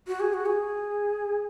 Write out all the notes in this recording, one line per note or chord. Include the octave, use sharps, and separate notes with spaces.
F#4
G#4
F#4
G#4